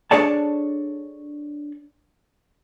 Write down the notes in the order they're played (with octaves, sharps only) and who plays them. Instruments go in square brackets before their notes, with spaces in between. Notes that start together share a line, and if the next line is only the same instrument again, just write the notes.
[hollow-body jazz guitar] D4 G#4 A4 C#5 D5 A5